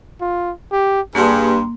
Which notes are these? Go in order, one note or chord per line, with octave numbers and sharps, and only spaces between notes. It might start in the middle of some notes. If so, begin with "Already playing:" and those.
F4
G4
G2 A#3 G#4 C6